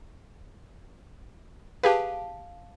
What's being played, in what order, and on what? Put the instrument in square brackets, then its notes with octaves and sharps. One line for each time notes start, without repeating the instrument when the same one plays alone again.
[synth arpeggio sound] G4 G#4 B4 [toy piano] F5 A5